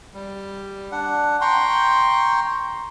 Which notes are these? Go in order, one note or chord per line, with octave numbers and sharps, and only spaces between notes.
G3
D4 F#5
G5 A#5 C6 C#6